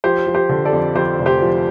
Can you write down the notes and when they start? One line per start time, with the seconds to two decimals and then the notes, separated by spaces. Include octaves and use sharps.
0.04 F3 G4 C5
0.27 F3
0.35 G4 C5
0.49 D3
0.65 A4 D5
0.73 F2
0.95 F2 G4 C5
1.19 F1
1.26 G4 C5
1.42 F3